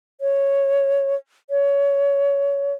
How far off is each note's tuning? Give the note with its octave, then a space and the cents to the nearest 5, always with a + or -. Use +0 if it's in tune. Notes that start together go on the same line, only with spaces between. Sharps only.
C#5 -5
C#5 +20